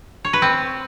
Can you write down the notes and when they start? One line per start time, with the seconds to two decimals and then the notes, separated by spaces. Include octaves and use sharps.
0.25 C#5
0.33 B4
0.42 C4